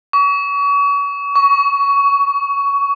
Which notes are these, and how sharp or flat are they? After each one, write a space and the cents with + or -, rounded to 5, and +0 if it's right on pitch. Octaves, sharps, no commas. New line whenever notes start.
C#6 +35
C#6 +15